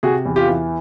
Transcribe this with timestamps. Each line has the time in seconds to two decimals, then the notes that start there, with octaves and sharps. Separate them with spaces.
0.03 C3 F#4 G#4
0.26 E2
0.36 F4 G4
0.47 E3